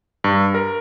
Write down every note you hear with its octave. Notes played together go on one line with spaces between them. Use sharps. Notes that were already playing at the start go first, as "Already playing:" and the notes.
G2
A#4